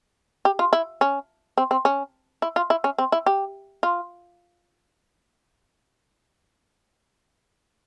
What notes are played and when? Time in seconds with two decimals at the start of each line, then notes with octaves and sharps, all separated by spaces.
0.45 G4
0.59 F4
0.73 E4
1.01 C#4
1.58 C4
1.71 C4
1.85 C#4
2.42 E4
2.56 F4
2.70 E4
2.84 C#4
2.98 C4
3.12 E4
3.26 G4
3.83 F4